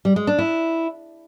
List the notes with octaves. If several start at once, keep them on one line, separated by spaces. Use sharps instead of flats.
G3
G#3
D4
E4